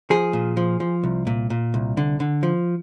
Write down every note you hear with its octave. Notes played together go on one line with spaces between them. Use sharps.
F3 G#4
A#2
F3
F3
C2
A#2
A#2
C2
D3
D3
F3